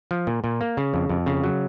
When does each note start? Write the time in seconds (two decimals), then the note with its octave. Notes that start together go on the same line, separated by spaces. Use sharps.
0.11 F3
0.27 A#2
0.44 A#2
0.61 A#3
0.77 C#3
0.94 F2
1.09 F2
1.26 C#3
1.44 F#3